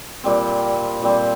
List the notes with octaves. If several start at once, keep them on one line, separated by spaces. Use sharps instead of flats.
A#2 G3 C4
A#2 G3 C4